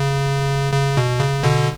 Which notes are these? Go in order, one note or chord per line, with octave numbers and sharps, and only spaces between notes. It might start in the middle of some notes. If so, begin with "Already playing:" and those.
Already playing: C#3
C#3
B2
C#3
B2 D3